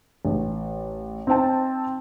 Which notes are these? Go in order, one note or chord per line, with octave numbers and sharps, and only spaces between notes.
A1
C4 D#4 C5 G5 A5